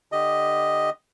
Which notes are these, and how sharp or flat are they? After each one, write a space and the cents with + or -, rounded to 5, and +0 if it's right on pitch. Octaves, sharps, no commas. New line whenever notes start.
D3 +15 G4 +0 D#5 +0